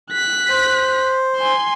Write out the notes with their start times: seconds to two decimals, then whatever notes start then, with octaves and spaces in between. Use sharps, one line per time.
0.10 F#6 B6
0.49 C5
1.36 G#5 C6